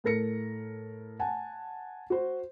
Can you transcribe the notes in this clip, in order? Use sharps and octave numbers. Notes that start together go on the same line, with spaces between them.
A2 A4 A#4 A#6 C#7
F#5 G#5 A5
F#4 C5